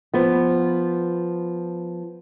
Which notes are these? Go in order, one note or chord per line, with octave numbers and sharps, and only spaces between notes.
F3 B3